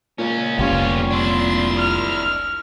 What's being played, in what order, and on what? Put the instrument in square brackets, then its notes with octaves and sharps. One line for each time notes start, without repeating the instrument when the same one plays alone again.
[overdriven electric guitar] C#2 C#4 [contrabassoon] A#2
[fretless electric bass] F1 C2 [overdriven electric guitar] B3 F4 [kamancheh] C#4 G4
[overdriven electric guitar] D4 E4 [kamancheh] C6
[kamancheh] F6